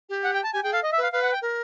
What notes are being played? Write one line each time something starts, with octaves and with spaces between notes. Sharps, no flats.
G4
F#5
G5
A5
G4 G#5
G#4 G5
A4 F5
D#5
E5
B4 F5
B4 F5
F#5
G5
A#4